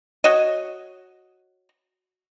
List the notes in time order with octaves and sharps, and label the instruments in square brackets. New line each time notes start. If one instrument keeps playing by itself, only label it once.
[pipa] F#4 C#5 D#5